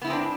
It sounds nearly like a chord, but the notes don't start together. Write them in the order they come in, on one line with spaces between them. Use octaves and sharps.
B3 E4 G#3 C4 D4